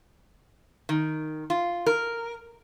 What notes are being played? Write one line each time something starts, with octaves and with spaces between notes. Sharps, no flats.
D#3
F4
A#4